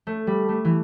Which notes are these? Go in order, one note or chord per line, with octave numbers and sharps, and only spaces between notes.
A3
G3
A3
E3